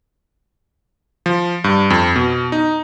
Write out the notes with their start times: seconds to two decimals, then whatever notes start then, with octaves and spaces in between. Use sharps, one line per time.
1.26 F3
1.64 G2
1.90 F2
2.16 B2
2.52 D#4